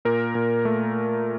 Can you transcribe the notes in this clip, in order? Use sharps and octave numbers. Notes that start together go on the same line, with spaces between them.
A#2 A#4
A#2
A3